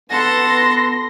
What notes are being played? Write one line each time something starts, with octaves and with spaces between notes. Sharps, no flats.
B3 A4 F#5 C6 A#6